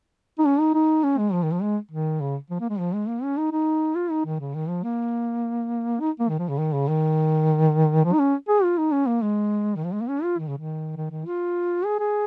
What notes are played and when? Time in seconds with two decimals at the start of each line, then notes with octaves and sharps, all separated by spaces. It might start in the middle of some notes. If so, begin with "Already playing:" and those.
0.38 D#4
0.46 C#4
0.60 D#4
0.74 D#4
1.04 C#4
1.18 G#3
1.32 F3
1.43 D#3
1.52 F3
1.62 G#3
1.91 D#3
2.21 C#3
2.50 F3
2.60 A#3
2.69 G#3
2.79 F3
2.94 G#3
3.08 A#3
3.23 C#4
3.38 D#4
3.52 D#4
3.95 F4
4.11 D#4
4.25 D#3
4.40 C#3
4.55 D#3
4.69 F3
4.83 A#3
6.00 D#4
6.19 A#3
6.29 D#3
6.39 F3
6.49 C#3
6.58 D#3
6.73 C#3
6.88 D#3
8.04 F3
8.13 D#4
8.19 C#4
8.48 G#4
8.64 F4
8.78 D#4
8.92 C#4
9.07 A#3
9.22 G#3
9.75 D#3
9.85 F3
9.93 G#3
10.01 A#3
10.09 C#4
10.23 F4
10.38 D#3
10.48 C#3
10.57 D#3
10.96 D#3
11.11 D#3
11.26 F4
11.85 G#4
11.99 G#4